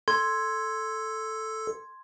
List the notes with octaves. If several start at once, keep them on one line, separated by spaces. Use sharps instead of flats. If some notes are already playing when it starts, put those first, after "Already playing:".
A4 C6 G#6